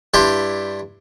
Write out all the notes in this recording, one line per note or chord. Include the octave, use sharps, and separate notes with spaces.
G2 D4 E4 G4 E5 C6